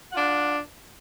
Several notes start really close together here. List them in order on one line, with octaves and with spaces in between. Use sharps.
F#5 F4 D4